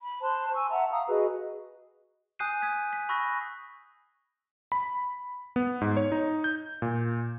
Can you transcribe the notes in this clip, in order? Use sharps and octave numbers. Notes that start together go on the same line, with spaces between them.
B5
C5 A5 C6 F#6
G#5 C#6 E6
E5 F#5 A5 A#5
F5 A#5 D#6 E6
F#4 G#4 B4 D#5
G#5 D#6 F#6 G6 C7 D#7
D#6 G#6 B6
B6
B5 C#6 E6 F#6 A#6 B6
B5
B3
G#2
C#5
D#4
G6
A#2